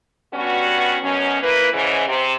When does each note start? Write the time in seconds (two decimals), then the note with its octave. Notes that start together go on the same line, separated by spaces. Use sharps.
0.33 G2 G3 B3 C#4 F#4
1.02 F#2 B2 F#3 C#4
1.42 A#3 E4 B4
1.72 G#2 C#3 E3
2.08 C3